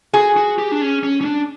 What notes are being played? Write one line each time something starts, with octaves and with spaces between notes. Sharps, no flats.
F#4 G#4
F#4
G4
D4
C#4
C#4
C#4
D4